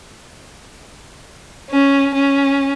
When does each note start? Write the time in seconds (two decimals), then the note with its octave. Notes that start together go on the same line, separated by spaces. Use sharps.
1.70 C#4
2.14 C#4